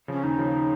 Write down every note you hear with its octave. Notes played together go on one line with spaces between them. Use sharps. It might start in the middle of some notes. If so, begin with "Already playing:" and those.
C#3 F3 C#4
D#2 D#4
C#3 F3